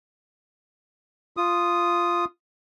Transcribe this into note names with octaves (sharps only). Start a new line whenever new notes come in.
F4 D#6